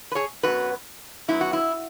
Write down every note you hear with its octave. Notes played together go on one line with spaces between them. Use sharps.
B4
G#4 C#5
F#2 F#3 B3 F#4 B4
F#2 F#3 B3 E4
F#4
E4